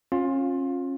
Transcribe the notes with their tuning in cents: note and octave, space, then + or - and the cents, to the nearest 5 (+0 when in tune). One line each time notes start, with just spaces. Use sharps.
C#4 -35 F4 +20